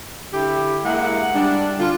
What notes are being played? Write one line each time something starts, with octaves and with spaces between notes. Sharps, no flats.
D3 E4 G4
G#3 A#3 E4 E5 F#5
G3 D4
D3 D4 F4